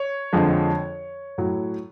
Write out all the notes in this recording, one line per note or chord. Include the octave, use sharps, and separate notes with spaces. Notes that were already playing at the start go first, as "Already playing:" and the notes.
Already playing: C#5
F2 D3 F3 G#3
A2 F#3